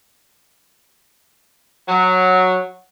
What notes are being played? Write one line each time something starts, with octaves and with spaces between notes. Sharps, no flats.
F#3